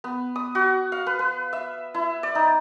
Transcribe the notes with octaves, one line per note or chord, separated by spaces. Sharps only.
B3
D#6
F#4
F5
B4
B4
E5
E4
D5
D#4